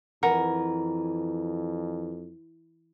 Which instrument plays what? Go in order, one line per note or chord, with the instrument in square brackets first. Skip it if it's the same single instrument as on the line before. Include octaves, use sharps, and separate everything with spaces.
[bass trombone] F2 [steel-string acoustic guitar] E3 [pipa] A#4 [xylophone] F#5